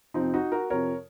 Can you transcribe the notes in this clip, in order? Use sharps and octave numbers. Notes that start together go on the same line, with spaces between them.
F2 C3 F3 C4 D#4
D#4 F#4
F#4 A#4
F2 C3 F3 A#4 C#5